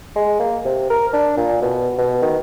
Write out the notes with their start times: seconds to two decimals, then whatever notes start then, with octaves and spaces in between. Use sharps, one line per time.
0.16 G#3
0.40 A#3
0.65 C3
0.90 A#4
1.13 D4
1.37 A#2
1.62 B2
1.98 B2
2.22 D#3